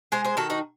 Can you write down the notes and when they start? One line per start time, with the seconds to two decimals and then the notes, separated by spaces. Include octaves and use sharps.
0.12 G#3 G#4 C5
0.24 G#4 C5
0.37 D#3 F#4 A4
0.50 D#4 F#4